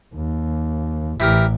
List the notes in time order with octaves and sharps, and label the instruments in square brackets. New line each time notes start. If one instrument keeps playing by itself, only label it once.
[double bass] D#2
[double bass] A1 [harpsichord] E3 G4 A#4